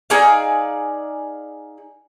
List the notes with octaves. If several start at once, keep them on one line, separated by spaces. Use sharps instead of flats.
D#4 G#4 D5 F5